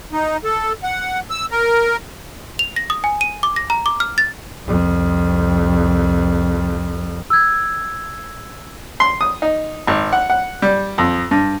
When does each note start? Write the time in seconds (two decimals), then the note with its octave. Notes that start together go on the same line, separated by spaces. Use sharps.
0.13 D#4
0.44 A4
0.83 F#5
1.30 E6
1.51 A#4
2.59 F7
2.76 A#6
2.90 D#6
3.04 G#5
3.21 D#7
3.43 D6
3.56 A#6
3.70 A#5
3.86 D6
4.00 F6
4.18 A6
4.64 C2 F2
7.30 E6 G#6
9.00 C6
9.21 D#6
9.42 D#4
9.87 G#1
10.13 F#5
10.30 F#5
10.62 G3
10.98 F2
11.31 G2